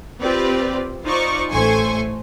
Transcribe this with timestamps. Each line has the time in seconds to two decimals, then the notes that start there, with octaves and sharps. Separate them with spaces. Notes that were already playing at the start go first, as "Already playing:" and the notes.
0.21 C4 F4 G4 B4 D5
1.04 D#4 F4 C5 D5 C#6 D6
1.52 A1 A3 C5 G#5 C#6